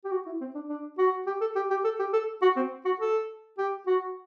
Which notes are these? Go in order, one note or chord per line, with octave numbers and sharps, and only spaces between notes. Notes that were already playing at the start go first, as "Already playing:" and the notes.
G4
F#4
E4
C4
D4
D4
F#4
G4
A4
G4
G4
A4
G4
A4
F#4
C4
F#4
A4
G4
F#4